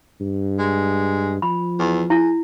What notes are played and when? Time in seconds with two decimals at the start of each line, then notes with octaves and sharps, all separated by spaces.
0.20 G2
0.59 G#3
1.42 F3 B5
1.80 E2
2.10 E4 G#4